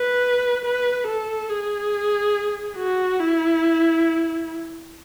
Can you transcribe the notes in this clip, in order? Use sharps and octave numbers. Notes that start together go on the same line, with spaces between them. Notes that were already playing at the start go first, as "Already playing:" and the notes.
Already playing: B4
B4
A4
G#4
F#4
E4